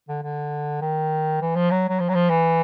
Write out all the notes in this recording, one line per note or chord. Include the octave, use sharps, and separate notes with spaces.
D3
D3
D#3
E3
F3
F#3
F#3
F3
F#3
F3
E3